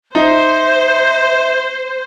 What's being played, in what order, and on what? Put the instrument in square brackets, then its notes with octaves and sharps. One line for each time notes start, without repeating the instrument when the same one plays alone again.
[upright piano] D#4 [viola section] C5 [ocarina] E5